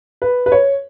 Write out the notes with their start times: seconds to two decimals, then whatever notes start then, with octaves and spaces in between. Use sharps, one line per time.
0.22 B4
0.46 B4
0.52 C#5